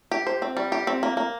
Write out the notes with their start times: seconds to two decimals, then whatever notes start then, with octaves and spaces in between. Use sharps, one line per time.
0.11 G4
0.27 C5
0.42 C4
0.57 G3
0.72 G4
0.87 C4
1.03 A#3
1.17 A#3